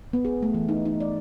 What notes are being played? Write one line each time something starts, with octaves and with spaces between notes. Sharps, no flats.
B3
G#4
A3
E3
D#4
D#4
D5